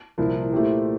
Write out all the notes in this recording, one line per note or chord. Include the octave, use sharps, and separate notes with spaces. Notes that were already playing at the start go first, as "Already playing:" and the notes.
C2 A#2 F3 A#3 E4
A#2 A3 E4 G4 C5